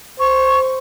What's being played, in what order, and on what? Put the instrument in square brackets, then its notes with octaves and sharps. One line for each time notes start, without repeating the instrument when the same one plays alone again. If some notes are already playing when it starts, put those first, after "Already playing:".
[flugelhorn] C5 [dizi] C#6